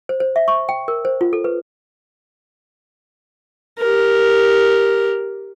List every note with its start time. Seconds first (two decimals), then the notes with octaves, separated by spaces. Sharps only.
0.09 C5
0.20 C5
0.36 E5
0.48 C#6
0.69 G5
0.88 A#4
1.05 C5
1.21 F4
1.33 A4
1.44 B4
3.79 G4 A#4